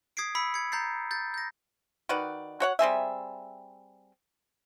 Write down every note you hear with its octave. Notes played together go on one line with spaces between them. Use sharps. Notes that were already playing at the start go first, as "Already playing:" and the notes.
D#6 G#6 B6 C7 D7
B5 E6 B6 C#7
G#6 C#7
A#5 G6 A6 C7
G6 A6
G6 A#6
D#3 F#4 B4 D5
F#4 C#5 F#5
G3 C4 G#4 E5